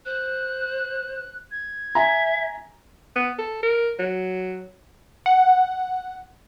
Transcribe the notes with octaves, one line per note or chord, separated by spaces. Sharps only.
C5 F#6
G#6
E5 G#5 A#5
B3
A4
A#4
F#3
F#5